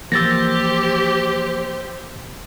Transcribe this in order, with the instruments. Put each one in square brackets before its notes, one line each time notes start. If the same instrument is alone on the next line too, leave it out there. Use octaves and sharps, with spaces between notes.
[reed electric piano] E3 F3 A#3 [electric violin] G4 [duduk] C5 [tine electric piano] E6 A6 A#6